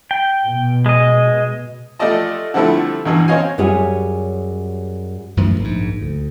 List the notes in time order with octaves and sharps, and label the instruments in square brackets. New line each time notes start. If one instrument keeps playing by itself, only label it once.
[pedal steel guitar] G5
[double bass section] B2
[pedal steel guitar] G#3 D#5
[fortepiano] A3 F4 G4 D5 D#5 A5
D3 F3 G3 A3 C4 E4
E2 G2 B2 E3
C4 C#4 C#5 D#5 F5 G#5
[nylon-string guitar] F#2 G3 G#4 C#5 F#5 G#5
[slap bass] F#2 A2 D#3 F3
A#1 G#2
D2